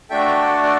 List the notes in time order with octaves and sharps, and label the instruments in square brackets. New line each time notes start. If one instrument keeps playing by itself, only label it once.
[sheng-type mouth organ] A3 D4 F#4 A4 E5 G5
D5 F#5
D5